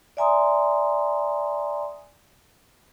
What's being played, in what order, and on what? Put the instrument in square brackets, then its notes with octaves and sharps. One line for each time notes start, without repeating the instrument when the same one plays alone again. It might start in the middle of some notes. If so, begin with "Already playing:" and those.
[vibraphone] D5 E5 G#5 A#5 C6 D#6